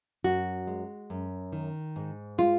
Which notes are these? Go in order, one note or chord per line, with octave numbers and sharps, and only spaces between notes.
F#2 F#4
G#3
F#2
D#3
G#2
G#3 F4